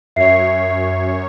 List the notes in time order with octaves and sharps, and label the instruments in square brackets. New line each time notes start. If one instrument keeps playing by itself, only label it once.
[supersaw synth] F#2 C#5 [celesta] E5 C7